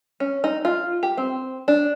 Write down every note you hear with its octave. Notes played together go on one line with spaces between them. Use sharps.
C#4
D#4
F4
G4
C4
D4